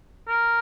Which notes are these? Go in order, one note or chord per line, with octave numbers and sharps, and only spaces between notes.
A#4